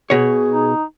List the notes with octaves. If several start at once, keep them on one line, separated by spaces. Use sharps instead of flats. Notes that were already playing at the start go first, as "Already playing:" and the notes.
B2 G#4 C#5
D#4